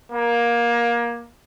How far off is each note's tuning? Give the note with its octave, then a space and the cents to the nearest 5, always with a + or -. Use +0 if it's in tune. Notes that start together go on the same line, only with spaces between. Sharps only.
A#3 +20